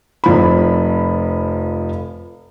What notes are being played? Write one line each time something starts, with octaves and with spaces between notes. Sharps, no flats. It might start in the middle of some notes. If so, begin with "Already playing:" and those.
F1 F3 B5